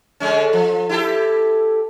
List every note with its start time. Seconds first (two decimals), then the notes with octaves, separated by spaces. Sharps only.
0.20 D3 G#3 C#4
0.53 F3
0.89 E4 G4 A4